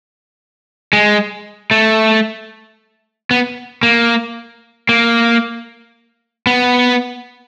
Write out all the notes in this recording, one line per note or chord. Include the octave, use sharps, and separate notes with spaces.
G#3
A3
B3
A#3
A#3
B3